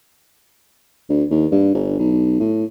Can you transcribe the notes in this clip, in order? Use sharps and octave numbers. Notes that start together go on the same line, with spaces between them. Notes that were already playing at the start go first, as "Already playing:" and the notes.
D2
D#2
G2
G1
B1
A2